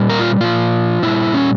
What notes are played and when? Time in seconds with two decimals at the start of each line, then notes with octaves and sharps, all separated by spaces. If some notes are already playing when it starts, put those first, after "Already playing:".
Already playing: A#2 G3
0.10 A#4
0.20 F4
0.40 A#2 F3 F4
1.02 A#2 G3 E4
1.34 C#4